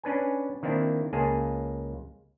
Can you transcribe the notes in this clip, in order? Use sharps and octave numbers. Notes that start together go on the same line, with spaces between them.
C#4 D4 B4 G#5
D#3 A#3 C4 D4 E4
C#2 A#3 G#4 G#5 A5